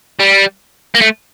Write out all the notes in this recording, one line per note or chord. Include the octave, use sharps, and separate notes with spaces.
G3
A#3
A3